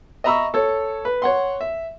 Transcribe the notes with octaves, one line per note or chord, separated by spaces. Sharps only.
D#5 E5 A#5 B5 C#6 E6
A4 C#5
B4
C#5 F#5 C6
E5